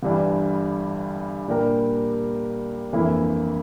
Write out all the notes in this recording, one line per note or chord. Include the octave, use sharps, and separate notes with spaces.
G1 G2 E3 G3 D4
A#2 G3 D4 G4 A#4
G1 F2 E3 A#3 E4